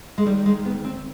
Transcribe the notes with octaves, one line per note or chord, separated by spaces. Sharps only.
G#3
D#3 G3
G#3
D2 B3
C4